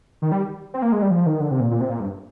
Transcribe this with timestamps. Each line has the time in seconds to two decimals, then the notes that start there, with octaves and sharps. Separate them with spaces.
0.22 D#3
0.32 G3
0.74 C4
0.82 A#3
0.92 G#3
1.02 G3
1.11 F3
1.26 D#3
1.41 D3
1.51 C3
1.60 A#2
1.71 A#2
1.81 C3
1.90 A#2
2.00 G2